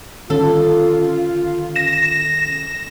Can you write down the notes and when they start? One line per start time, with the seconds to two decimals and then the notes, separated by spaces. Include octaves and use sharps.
0.30 D3 D#3 C#4 F4 A4
1.76 A#6 E7